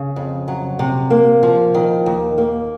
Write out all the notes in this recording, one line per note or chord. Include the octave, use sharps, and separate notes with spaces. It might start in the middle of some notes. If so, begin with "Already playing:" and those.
Already playing: C#3
F2
F#3
C3
A#3
F3
D#3
D#2
A#3